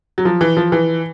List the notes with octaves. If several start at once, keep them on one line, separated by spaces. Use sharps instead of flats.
F#3
F3
E3
F3
E3